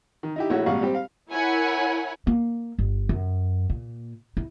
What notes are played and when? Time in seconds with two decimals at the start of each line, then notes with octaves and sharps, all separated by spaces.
0.23 D#3
0.36 D#4 E4 G4
0.50 A#1 A3 E4 F#4 C#5
0.66 G#1 A#2 G3 F5 F#5 C#6
0.82 G3 C4 G4
0.95 F5
1.31 E4 A#4 C#5 F#5 G#5 B5
2.27 A#3
2.79 G1
3.09 F#2
3.70 A#2
4.37 E4